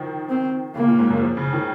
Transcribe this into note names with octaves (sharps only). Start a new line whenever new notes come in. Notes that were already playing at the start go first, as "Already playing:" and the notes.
Already playing: D#3 F3
C4
C#3 A#3
A#2
G#2
F#2
F3
C#3
D#3